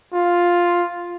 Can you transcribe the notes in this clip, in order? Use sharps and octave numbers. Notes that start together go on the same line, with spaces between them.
F4